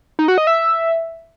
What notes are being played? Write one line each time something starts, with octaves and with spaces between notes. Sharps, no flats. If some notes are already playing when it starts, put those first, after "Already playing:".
D#4
F#4
D#5
E5